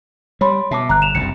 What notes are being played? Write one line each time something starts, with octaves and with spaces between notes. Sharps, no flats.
G3 C#5 B5 C6
B2 E5 A5 D6
G1 A#5 F#6
E7 F7
F#1 C2 G2 C#7